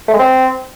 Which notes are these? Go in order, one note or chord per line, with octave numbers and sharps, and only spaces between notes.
A3
G#3
C4